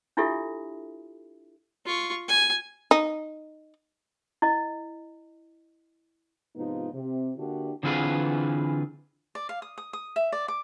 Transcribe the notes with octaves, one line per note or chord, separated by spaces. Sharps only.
D4 E4 F4 G4 A4 E5
F4 C#6
G#5
D#4
E4 D#5
G#2 C3 F3 B3 D#4 F4
C3
D3 A#3 D4 E4 F#4 G4
D3 E3 C4 F4 G#4 B4
D5
F5
D#6
D#6
D#6
E5
D5
D6